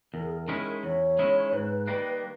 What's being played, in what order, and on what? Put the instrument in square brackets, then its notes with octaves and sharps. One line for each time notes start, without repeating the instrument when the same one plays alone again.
[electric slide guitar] E2 [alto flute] A#4
[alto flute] G#4
A#4
[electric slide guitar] D#3 G#3 C#4 E4 [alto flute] A#4
[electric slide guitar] E2 [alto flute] C#5
[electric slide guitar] D#3 G#3 C#4 E4
[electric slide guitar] G#2 [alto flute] B4
[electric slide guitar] D#3 G3 A#3